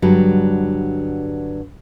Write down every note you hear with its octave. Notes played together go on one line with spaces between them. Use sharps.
G2 D3 F#3 G3